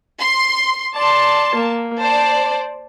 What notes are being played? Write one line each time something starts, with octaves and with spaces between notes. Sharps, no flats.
C6
D5 A5 C6
A#3
C5 D5 A5